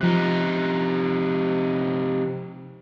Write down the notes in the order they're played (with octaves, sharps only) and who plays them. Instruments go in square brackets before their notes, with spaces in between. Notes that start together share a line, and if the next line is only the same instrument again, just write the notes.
[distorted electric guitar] C3 D#4 [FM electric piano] F3 F#6